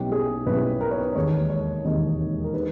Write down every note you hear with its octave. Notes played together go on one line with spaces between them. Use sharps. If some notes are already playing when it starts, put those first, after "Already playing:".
Already playing: B1 B2 G3 C#4 E4 G4
G#4
B1 B2 G3 C#4 E4 B4
A#4
C#5
B4
E1 D#2 D#3 G#3 C#5
C#5
E1 D#2 D#3 G#3 D#5
A#4
D#3 G#3 D#4 B4